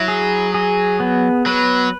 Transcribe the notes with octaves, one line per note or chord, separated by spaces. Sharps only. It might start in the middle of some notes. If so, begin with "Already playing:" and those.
Already playing: F#3 E4
G#4
G#4
B3
F#3 B4